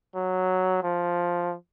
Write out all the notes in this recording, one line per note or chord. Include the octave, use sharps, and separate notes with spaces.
F#3
F3